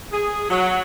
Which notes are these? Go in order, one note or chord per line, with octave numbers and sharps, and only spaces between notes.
G#4
F#3